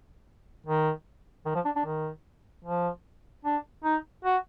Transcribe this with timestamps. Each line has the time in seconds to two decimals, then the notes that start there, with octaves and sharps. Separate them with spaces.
0.66 D#3
1.46 D#3
1.55 F3
1.65 D4
1.76 D4
1.85 D#3
2.65 F3
3.45 D4
3.84 D#4
4.25 F#4